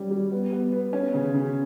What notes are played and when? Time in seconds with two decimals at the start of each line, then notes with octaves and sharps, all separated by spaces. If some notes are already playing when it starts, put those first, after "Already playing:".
Already playing: G3 C#4
0.11 G3
0.32 B3
0.52 B3
0.73 B3
0.93 C#4
1.14 C#3
1.34 C#3